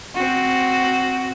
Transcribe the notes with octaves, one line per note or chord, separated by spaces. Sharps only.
C4 F#4